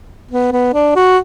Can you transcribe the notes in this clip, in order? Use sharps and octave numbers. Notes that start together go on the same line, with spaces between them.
B3
B3
D4
F#4